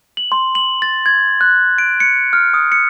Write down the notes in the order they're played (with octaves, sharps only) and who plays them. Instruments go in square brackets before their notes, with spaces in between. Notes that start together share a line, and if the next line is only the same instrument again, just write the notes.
[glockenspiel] F#7
C6
F#7
A6
G#6
F#6
D7
C#7
F6
D#6
C#7